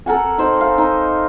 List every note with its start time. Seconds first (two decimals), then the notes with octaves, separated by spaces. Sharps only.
0.06 A4 A#4 F#5 G#5
0.38 D#4 C5 D#5
0.61 F5
0.78 D#4